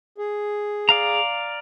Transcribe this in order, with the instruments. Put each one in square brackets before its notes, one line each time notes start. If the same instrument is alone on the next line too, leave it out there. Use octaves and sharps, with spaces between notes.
[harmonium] G#4
[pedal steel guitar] D5 F5 A#5